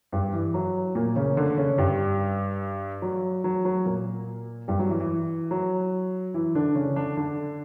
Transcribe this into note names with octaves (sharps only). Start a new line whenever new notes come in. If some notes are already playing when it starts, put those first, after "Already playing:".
G2 G3
E3
F#3
A#2 A#3
C#3 C#4
D3 D4
C#3 C#4
G2 G3
F#3
F#3
F#3
A#2 A#3
G2 G3
F#3
E3
E3
F#3
E3 E4
D3 D4
C#3 C#4
D3 D4
D3 D4